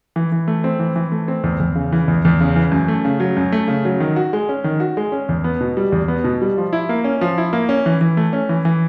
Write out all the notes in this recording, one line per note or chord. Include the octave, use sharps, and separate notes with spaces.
E3
E3
A3
C4
E3
E3
A3
C4
E2
E2
C#3
E3
E2
E2
C#3
E3
F#2
A3
C#3
F#3
F#2
A3
C#3
F#3
D#3
F#4
G#3
C#4
D#3
F#4
G#3
C#4
E2
B3
B2
G3
E2
B3
B2
G3
F3
E4
A#3
C#4
F3
E4
A#3
C#4
E3
E3
A3
C#4
E3
E3